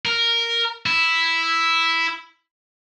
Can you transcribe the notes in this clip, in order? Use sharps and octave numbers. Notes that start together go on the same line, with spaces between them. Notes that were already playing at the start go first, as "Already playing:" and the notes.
A#4
E4